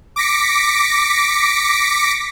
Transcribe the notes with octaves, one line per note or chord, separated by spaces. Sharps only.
D6 A#6 B6 C#7